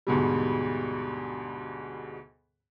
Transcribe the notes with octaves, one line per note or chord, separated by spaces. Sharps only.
D2 G#2 B2 G3